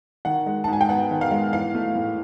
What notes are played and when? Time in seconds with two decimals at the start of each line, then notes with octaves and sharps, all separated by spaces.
0.25 D#3 F#5
0.46 G#3
0.64 A5
0.68 G#2
0.73 G#5
0.81 G5
0.89 B3 F#5
1.11 D#3
1.21 F5
1.31 G#3
1.53 E3 F5
1.75 A3
1.95 A2